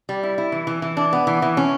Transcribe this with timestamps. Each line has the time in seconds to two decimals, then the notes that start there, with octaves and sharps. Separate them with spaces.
0.09 G3
0.23 E4
0.38 E4
0.52 E3
0.67 E3
0.82 E3
0.97 D4
1.13 B3
1.27 E3
1.42 E3
1.57 C#4